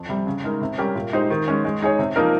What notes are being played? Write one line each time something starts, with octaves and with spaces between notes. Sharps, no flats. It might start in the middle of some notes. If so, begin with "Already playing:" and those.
Already playing: F2
C3 G3
C#3
G#3 D#4 A#4
C3
G3 C#4 G4 A#4
A#2
G#3 D#4 G4 C5
D#3
G#3 C#4
G#3
D#4 G#4 C#5
C3
F3 A#3 D#4 A#4